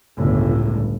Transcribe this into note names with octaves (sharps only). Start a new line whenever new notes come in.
G1 C#2 A2